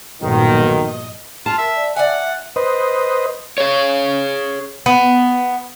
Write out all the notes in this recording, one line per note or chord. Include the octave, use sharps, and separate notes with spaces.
B1 G2 A#2 D#3 F3
D#5
F4 A5
A#4 E5
D5
D5 E5 F#5 G#5
B4 C5 D#5
G#4 C#5
B3